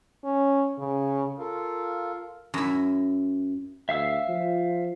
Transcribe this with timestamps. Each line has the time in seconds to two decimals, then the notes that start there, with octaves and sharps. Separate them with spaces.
0.24 C#4
0.78 C#3
1.39 F4 A4 A#4 F5
2.54 F#2 E4
3.89 D2 E5 F5 E6
4.29 F3